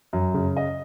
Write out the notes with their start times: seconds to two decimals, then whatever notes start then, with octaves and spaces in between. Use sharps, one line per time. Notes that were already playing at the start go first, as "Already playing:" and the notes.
0.13 F#2
0.34 C#3
0.57 D#5